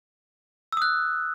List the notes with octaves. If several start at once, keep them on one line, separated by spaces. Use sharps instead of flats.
D#6 E6 F#6